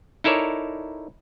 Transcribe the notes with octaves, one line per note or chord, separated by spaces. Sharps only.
D#4 E4 A4 A#4 C#5 D5